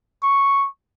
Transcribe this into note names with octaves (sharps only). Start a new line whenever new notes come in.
C#6